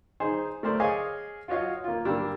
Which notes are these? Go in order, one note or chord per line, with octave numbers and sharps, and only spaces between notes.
D#4 G#4 C5
A3 A#4 C5 D5
G#4 C#5 D#5 F5 G#5 D6
F4 F#4 C#5 D#5 F5
A#3 F4
G2 G3 A#3 D4 A#5 E6